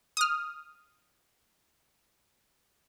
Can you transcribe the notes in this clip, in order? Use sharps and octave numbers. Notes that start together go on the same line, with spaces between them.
D#6 F6